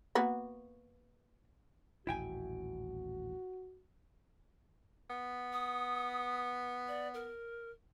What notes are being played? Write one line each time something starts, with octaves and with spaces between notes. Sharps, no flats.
A#3 B3 F#4
D#1 A1 E4 F#4 G5 G#5
B3
D#6
D5
A#4